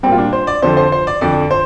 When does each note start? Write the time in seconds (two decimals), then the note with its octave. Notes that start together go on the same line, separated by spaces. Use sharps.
0.03 A#2 G3 C4
0.12 F4
0.18 D4
0.33 C5
0.47 D5
0.62 F2 D3 F3 C5
0.77 C5
0.92 C5
1.07 D5
1.21 F2 D3 F3 D5
1.51 C5